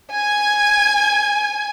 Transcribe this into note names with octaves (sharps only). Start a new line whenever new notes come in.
G#5 G#6